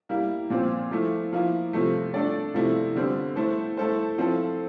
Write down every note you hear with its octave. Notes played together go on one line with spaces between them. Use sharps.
G3 A#3 E4
A#2 F3 C4
F3 A3 E4
F3 A#3 E4
C3 F3 A3
A3 D4 A4 D5
C3 F3 A3 E4
D3 G3 C4
A3 E4 A4 C5
A3 E4 A4 C5
F3 C4 E4 A4